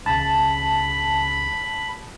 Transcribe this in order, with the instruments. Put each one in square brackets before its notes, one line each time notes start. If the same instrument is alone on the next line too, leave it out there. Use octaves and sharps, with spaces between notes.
[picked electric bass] C#2 C#3 [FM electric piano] A5 [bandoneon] B5